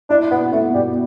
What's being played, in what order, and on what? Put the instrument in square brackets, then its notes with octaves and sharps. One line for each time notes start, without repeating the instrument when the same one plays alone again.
[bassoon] D4 [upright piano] E4
[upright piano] B2 [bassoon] B3
[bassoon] A3 [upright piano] B3
[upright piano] B2 [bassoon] G3